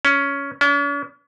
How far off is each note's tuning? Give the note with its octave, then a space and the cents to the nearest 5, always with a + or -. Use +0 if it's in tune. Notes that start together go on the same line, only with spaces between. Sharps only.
C#4 +10
C#4 +45